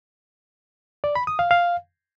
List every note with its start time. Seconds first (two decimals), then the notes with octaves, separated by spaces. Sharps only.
1.04 D5
1.15 B5
1.27 D#6
1.39 F5
1.51 F5